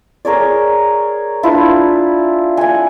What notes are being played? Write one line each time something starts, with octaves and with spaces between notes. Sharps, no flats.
G#4 A#4 C#5 D5
D4 E4 F4 B4
F#5 G#5